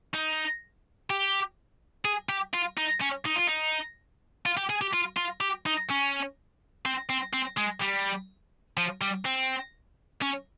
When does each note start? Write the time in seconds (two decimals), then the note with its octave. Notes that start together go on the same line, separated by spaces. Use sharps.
0.14 D#4
1.10 G4
2.05 G#4
2.29 G4
2.54 F4
2.78 D#4
3.01 C#4
3.25 D#4
3.36 F4
3.47 D#4
4.46 F4
4.57 G4
4.69 G#4
4.81 G4
4.93 F4
5.17 F4
5.41 G4
5.66 D#4
5.90 C#4
6.85 C4
7.10 C4
7.34 C4
7.58 G#3
7.82 G3
8.77 F3
9.01 G3
9.25 C4
10.22 C#4